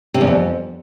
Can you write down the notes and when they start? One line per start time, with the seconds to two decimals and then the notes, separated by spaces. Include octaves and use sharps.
0.14 C3
0.21 E2
0.27 F2